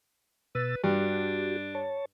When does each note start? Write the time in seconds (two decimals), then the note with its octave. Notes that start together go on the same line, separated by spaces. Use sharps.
0.55 B2 B4 E6 A6
0.84 G2 D4 F#4 G4
1.75 C#5 A5